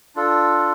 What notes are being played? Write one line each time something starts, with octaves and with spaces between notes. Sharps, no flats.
D4 F4 A4